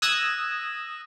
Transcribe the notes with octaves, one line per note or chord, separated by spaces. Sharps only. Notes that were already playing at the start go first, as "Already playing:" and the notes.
D#6 E6 F#6 G#6 A#6 E7